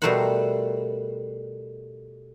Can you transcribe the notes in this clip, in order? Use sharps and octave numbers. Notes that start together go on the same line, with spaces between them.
B2 G3 A3 A#4 C5 F#5